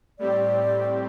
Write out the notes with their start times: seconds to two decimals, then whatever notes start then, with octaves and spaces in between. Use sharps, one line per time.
0.19 A2 G3 C4 G4 D5